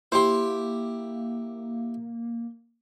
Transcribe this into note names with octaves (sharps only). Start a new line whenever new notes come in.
A#3 E4 G4 C5 C6